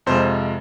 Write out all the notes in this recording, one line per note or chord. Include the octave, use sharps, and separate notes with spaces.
F2 C3 F3 G#3 C5